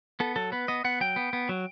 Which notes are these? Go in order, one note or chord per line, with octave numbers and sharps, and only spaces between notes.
B3 A4
F#3 A4
B3 B4
B3 D#5
B3 F#5
F#3 G5
B3
B3
F#3